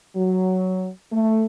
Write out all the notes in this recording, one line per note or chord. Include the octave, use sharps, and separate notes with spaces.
F#3
A3